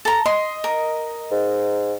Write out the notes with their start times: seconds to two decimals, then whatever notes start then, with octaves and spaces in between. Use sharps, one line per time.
0.05 A4 A#5
0.26 D#5 C6
0.64 A#4
1.32 G#2